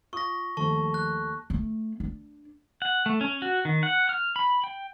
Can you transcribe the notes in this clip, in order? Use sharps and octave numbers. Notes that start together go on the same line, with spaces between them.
F4 C#6 D#6 A#6
D#2 D#3 F3 A3 A5 C#6
F#6
A3
D4
F#5
A3
C#4
F#4
D#3
F#5
F6
B5
G5